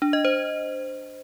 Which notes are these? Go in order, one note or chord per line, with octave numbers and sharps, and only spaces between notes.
D4
D#5
C5